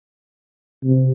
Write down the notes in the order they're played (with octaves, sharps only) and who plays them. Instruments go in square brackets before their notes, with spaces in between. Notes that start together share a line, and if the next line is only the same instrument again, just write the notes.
[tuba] C3